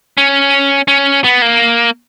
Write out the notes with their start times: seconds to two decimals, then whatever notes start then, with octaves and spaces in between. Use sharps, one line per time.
0.18 C#4
0.88 C#4
1.24 B3
1.42 A#3